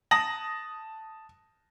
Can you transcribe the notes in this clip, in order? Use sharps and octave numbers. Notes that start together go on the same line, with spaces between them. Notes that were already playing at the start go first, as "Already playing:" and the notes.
A5 D#6 A#6 F#7